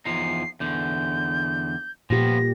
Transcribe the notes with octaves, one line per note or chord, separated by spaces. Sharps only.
E2 F3 D#4 C7
E2 D3 G6
A#2 F3 B3 G4 A#6